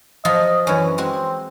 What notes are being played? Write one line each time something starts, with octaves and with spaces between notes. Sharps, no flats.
F3 F#3 F4 D#5
F#2 E3 C#4
G#3 C4 F#4